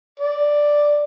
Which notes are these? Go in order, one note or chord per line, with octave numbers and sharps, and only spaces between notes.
D5